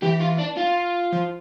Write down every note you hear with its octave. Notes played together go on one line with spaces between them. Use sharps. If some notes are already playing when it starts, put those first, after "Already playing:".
E3 G4
F4
D4
F4
F3